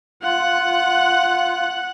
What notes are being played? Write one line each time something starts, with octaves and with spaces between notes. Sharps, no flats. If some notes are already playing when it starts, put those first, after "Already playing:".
F4 F#5 F#6